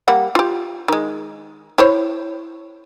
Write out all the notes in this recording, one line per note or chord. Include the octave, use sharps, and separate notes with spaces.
G3 A#3 F#5
F4 G4
D#3 G#3
E4 C5 C#5